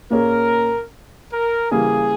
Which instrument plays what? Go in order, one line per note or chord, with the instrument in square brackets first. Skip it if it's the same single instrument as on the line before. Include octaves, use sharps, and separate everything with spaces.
[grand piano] A#2 A#3 C#4 G#4 [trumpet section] A#4
[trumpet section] A#4
[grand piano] C#3 E3 G3 A#3 [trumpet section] G#4